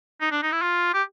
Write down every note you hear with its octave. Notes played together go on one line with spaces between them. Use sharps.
D#4
D4
D#4
E4
F4
G4